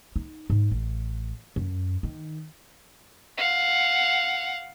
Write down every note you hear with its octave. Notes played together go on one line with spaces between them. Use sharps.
D#4
G#2
A1
F#2
D#3
F5 F#5